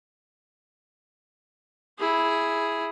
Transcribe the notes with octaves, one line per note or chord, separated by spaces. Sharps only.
E4 G#4